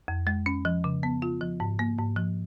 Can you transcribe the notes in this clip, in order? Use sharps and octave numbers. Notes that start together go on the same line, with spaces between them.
F2
G#3
C#4
F3
C#3
B3
F4
F3
G#2
A#3
G#2
F3